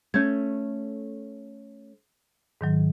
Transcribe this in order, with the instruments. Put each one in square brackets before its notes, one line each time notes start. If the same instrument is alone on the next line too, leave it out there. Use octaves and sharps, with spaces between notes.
[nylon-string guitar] A3 C#4 [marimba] G6 G#6
[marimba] G#2 D#3 F#3